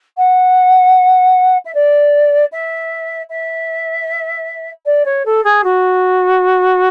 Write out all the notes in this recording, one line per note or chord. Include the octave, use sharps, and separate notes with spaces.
F#5
E5
D5
E5
E5
D5
C#5
A4
G#4
F#4